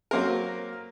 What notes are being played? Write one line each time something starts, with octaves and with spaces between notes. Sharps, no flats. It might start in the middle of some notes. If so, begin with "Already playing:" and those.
F#3 A#3 C4 A#4